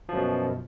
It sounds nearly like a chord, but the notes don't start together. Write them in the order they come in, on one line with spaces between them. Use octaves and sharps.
F3 F#2 B2